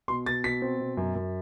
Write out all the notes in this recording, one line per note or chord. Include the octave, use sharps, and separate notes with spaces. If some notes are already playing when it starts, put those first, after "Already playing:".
B2 C6
B2 A6
B2 B6
C4
B2
F#2
F#2